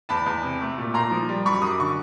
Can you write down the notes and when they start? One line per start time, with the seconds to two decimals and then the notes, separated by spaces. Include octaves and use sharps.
0.09 E2 A5 B5
0.26 E2
0.43 C3
0.61 A3
0.78 A#2
0.94 A#2 A#5 C6
1.11 F3
1.29 G3
1.45 F#2 B5 C#6
1.62 F#2 D#6
1.71 D6
1.79 D3 C#6